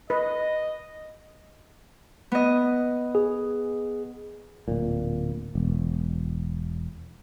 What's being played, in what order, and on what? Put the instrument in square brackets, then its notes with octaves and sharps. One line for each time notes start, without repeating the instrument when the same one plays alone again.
[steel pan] B4 [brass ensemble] D#5
[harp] B3 D#5
[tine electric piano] G#4
[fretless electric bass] D1 A#2
E1